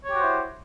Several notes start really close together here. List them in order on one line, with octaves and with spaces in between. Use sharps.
C#5 G4 F#4 C5 E4